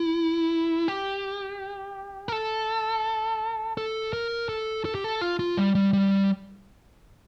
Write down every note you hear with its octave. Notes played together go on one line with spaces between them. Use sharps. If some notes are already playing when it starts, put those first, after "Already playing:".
Already playing: E4
G4
A#4
A4
A4
A#4
A4
A4
G4
A4
F4
F4
G3
G3
G3